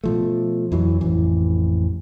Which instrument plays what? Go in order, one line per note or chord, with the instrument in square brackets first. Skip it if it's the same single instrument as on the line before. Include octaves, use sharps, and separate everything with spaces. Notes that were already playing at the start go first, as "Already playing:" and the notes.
[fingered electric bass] B2 F3 A3
F2 E3 F#3
A1 F2 E3